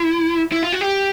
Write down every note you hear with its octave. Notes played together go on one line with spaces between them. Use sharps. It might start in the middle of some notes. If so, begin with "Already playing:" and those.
Already playing: E4
E4
F4
F#4
G4